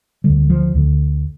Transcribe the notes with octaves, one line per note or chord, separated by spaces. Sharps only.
D2 D3 G3
F3
D2 D3